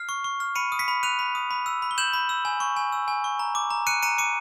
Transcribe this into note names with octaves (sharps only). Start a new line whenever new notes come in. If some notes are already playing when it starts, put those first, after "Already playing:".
Already playing: F6 C7
C#6
C#6
F6
B5 C#7 D#7
D#6
B6 C#7
B5
F#6 D#7 F7
B5
D#6
B5
E6
B5
G7
G6 E7 F#7
B5
E6
G#5
C#6
G#5
E6
G#5
C#6
A#5
D6
A#5
F#6 C#7 D#7
A#5 C#7 D#7
D6 C#7 D#7